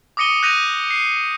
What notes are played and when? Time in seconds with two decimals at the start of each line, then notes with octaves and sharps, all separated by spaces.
0.17 D6 D#6 A#6 C#7 D#7 G7
0.43 F#6 G6 A#6 D#7 F7
0.90 C7